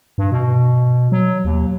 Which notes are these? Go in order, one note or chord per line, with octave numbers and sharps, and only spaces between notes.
G2
B2
F#3
D#2